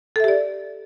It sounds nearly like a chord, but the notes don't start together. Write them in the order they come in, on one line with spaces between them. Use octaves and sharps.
A4 E5 G4 D5